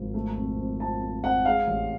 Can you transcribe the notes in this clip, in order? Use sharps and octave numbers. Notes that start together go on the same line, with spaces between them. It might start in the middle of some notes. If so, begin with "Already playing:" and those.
Already playing: G#1 F3
A3
F2
F2
F3 A5
A3
F2 F#5
G#3 F5
A1